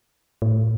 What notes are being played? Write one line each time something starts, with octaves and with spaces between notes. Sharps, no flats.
A2